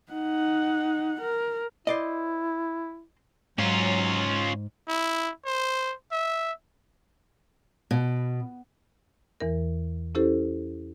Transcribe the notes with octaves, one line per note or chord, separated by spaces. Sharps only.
D#4 F#5
A#4
E4 C5 D5 D#5
G#2 F#3 C#4 F4
E4
C5
E5
B2
E2 E3 A#4
C#4 E4 G4 A4 C5